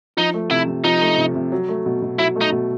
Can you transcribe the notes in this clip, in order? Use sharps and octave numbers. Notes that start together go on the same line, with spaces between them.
F3 D#4
A3
C3 E4
C3
F3 D#4
A3
C3
C3
F#3
A3
B2
B2
F#3 E4
A3
D#4
B2